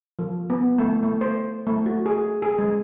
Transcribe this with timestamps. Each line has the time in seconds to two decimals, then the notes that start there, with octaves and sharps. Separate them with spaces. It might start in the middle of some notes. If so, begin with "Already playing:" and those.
0.19 F3
0.50 B3
0.78 A3
1.03 A3
1.21 C5
1.67 A3
1.86 F#4
2.06 G#4
2.42 G#4
2.59 G#3